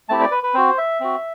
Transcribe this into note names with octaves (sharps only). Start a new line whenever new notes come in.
A3 C4 E4 G4 A5
D5
B4
B4
C4 F#4 C5
E5
C4 F#4